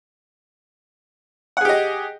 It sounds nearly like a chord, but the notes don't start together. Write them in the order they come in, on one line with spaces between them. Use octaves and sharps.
F#5 G#4 G4 D#5